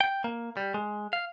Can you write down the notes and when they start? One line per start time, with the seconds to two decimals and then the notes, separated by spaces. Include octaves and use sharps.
0.01 G5
0.24 A#3
0.57 G3
0.74 G#3
1.13 F5